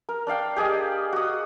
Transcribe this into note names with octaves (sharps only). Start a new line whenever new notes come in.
A#4
D4 D5 F5 G5
G4 G#4 D5 D#5
F#4 D#6